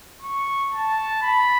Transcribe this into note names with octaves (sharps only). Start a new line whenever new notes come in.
C#6
A5
B5